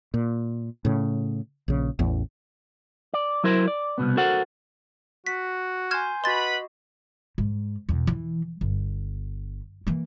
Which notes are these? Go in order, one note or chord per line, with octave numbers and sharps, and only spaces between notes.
A#2
A2 C#3
A#1 C#3
A1 E2
D5
F#3 E4 A#4 C5
D5
C2 F#2 B2 B3
F#4 A4 A#4 C5 F#5
F#4 B6
G#5 C6 F6 G6 G#6 E7
F#4 B4 D#5 F#5 B5 C6 A6
G#2
E2 B2
E3
G1
E3 A#3